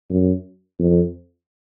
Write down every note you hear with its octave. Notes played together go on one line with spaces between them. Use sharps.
F#2
F2